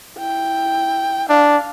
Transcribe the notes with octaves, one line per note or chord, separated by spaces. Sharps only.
E4 G5
D4 F5